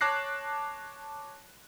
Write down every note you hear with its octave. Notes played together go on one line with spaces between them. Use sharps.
C#5 A5 D6 F#6 A#6 C7